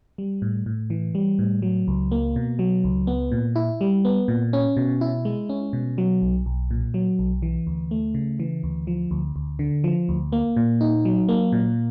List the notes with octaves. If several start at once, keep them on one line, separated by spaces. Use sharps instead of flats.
G3
A2
A2
E3
G3
A2
F#3
C#2
A#3
B2
F#3
C#2
B3
A#2
E4
G3
B3
A#2
C#4
B2
E4
G#3
C#4
B2
F#3
B1
B1
A#2
F#3
B1
E3
D2
A3
C#3
E3
D2
F3
D2
D2
D3
F3
D2
A#3
A#2
D#4
F#3
A#3
A#2